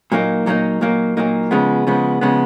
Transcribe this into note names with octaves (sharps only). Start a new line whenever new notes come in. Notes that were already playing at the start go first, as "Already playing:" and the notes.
A#2 F#3 A#3 D#4
A#2 F#3 A#3 D#4
A#2 F#3 A#3 D#4
A#2 F#3 A#3 D#4
C#3 F3 G#3 B3
C#3 F3 G#3 B3
C#3 F3 G#3 B3